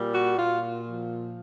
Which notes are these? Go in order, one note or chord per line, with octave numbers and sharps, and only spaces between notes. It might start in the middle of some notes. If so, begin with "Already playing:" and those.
Already playing: A#2 G3
F#4
A#2 F4
F3